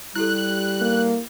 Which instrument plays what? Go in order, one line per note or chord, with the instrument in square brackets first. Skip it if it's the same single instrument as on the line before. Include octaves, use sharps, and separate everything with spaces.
[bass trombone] G3 [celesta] E4 G4 A4 [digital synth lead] F#6
[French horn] A#3